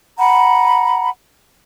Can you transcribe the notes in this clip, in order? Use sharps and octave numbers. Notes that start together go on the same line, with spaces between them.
F#5 A#5 B5